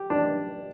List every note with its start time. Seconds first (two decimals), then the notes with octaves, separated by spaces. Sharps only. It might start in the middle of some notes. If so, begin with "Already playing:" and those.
Already playing: G4
0.10 D4